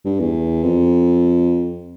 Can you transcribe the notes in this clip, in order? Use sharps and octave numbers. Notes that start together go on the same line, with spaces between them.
G2
E2
F2